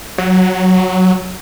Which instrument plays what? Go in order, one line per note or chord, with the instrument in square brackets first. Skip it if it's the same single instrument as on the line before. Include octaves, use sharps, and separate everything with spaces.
[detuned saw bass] F#3